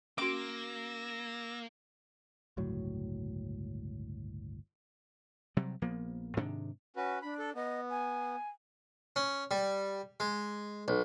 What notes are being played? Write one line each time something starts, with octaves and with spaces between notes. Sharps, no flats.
A#3 C#4 F#4 D6 E6 A#6
G1 C#2 A2 F#3
C3 F#3 G3
A#1 F3 A#3 B3
G#2 C3 D#3 D4
C#4 F#4 B4
D4 B5
A4
B3 D#5
G#5
C#4
G3
G#3
B1